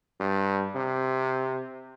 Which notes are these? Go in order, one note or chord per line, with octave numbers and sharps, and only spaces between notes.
G2
C3